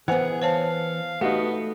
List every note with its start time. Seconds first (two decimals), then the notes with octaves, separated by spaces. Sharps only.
0.08 E3 B3 G#4 C5 F#5 G#5
0.42 C5 C#5 F5 A5
1.21 A3 B3 D#4 F#4 G4